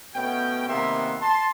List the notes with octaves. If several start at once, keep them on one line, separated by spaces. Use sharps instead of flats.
B2 A3 B3 C#4 G5
C3 D#3 A#3 B3 E5 C6
A5 C6